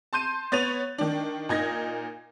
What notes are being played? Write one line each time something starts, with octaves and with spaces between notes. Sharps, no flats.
A5 C6 G6 D#7
B3 C#5 A6 D#7 F7
D#3 D4
A#2 D#4 G#6 A#6